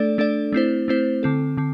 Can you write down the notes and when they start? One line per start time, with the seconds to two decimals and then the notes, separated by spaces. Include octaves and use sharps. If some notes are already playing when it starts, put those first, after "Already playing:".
Already playing: A3 D4 A4 D5
0.18 A3 D4 A4 D5
0.53 A3 C4 E4 C5
0.88 A3 C4 E4 C5
1.23 D3 C4 A4
1.57 D3 C4